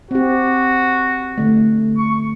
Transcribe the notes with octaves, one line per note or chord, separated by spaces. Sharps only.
C4 F#4 G4
D3 A3
C#6